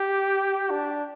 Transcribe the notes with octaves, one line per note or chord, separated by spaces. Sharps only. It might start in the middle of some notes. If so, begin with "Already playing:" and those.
Already playing: G4
D4